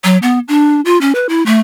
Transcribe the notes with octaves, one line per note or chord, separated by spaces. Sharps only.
F#3
B3
D4
F4
C#4
B4
E4
A3